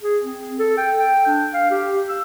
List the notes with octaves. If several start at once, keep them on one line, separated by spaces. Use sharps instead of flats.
G#4
C4
A4
G5
G5
D4
F5
G4
E6